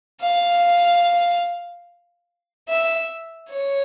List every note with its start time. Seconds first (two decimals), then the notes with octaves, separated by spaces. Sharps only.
0.22 F5
2.69 E5
3.52 C#5